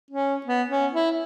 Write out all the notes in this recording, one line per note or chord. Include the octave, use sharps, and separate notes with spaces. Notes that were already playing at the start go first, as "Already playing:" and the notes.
C#4
B3
C#4
E4